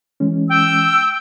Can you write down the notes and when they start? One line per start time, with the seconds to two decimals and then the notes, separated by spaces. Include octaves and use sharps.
0.20 E3 G#3 C#4
0.49 G5 E6